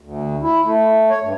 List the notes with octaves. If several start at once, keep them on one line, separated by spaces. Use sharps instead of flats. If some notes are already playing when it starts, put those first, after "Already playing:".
D2
E4
A3
C#5
G2